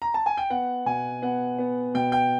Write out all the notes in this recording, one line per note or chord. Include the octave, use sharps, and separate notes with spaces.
A#5
A5
G#5
G5
B3 F#5
B2 G#5
B3 F#5
B3
B2 G5
G5